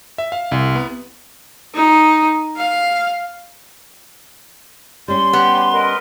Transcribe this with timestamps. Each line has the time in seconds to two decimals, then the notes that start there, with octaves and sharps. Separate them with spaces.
0.18 E5
0.32 F5
0.52 C2
0.75 B3
1.74 D#4
2.57 F5
5.08 G3 C#4 C6
5.33 B3 G4
5.74 A#4 B4 D#5